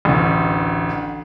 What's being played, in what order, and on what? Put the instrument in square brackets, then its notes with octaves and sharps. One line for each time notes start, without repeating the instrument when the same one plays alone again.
[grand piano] A1 D2